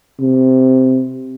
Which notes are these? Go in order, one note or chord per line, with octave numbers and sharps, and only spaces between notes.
C3